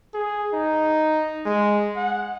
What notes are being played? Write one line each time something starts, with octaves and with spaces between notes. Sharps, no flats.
G#4
D#4
G#3
F#5